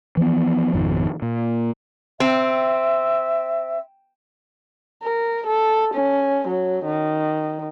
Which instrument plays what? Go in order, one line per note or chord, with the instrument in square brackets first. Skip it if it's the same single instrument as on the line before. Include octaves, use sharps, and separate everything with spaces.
[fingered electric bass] E3 F3 A3 B3
G#1 F2 B2 D#3
A#2
[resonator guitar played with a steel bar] C4 [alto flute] E5
[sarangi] A#4
A4
C#4
F#3
D#3